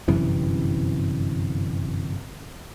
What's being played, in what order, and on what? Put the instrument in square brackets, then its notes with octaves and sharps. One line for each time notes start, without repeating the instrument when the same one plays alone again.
[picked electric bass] G1 F#2 C3 E3